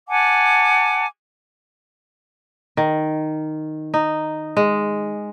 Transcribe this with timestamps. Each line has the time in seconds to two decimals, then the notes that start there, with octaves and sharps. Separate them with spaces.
0.09 F#5 G#5 A5 D6
2.77 D#3
3.94 D#4
4.57 G#3